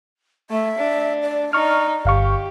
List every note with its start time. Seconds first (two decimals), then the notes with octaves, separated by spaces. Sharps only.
0.50 A3 E5
0.79 D4
1.23 D5
1.53 D#4 C#6 F6
2.05 G1 G4 F5 C#6